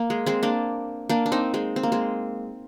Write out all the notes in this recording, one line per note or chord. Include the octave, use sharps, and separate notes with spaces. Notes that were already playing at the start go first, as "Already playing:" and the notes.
Already playing: A#3
G#3
G#3 C4
A#3 D4
A#3 D4
D4
C4 D#4
G#3 C4
C4
A#3
G#3 C4